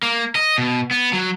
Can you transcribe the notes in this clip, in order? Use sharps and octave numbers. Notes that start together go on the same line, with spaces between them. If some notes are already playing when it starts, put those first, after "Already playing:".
A#3
D#5
B2
B3
F#3